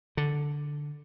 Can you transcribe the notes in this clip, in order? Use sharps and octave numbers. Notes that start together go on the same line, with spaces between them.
D3